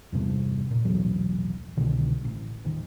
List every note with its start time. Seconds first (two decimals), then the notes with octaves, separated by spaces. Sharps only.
0.12 E2 G2 C3
0.71 A#2
0.85 D1 B1 E2 F#3
1.77 C2 B2 D3 D#3
2.25 A1
2.65 D#1 D#3